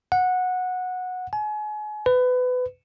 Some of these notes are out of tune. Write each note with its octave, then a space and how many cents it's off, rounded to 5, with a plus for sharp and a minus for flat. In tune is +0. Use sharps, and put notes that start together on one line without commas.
F#5 -15
G#5 +35
B4 +25